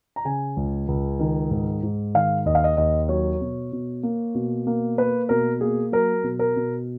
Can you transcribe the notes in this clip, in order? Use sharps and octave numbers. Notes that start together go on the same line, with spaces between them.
A#5
C#3 G#5
C#2
C#2
D#3
G#2
G#2
D#3 F5
D#2 D#5
F5
D#5
D#2 D#5
F#3 C#5
B2
B2
A#3
B2
A#3
A#3 B4
B2 A#4
A#3 G#4
F#3 A#4
B2
A#4
B2